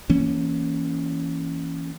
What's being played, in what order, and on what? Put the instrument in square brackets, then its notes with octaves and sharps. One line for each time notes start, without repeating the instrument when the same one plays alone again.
[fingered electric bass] E3 A#3 C#4